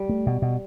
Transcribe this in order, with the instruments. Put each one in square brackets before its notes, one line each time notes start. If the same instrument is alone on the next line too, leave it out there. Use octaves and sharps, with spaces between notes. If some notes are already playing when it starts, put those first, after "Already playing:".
Already playing: [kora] G3
[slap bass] A3
B2
B2